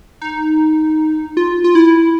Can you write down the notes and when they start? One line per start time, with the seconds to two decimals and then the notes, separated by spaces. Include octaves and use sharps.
0.21 D#4
1.37 F4
1.64 F4
1.75 E4